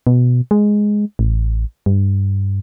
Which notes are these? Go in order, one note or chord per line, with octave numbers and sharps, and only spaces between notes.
B2
G#3
A1
G2